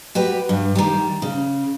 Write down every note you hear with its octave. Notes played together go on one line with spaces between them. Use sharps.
F#4 G4 B4
G2
D#3 G3
C#3